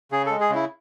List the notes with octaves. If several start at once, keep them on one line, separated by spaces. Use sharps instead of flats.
C#3 G#4
G#3 A4
G#4
C#3
E4